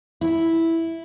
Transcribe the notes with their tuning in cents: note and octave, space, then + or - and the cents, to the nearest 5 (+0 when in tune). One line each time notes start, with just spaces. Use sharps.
E4 -5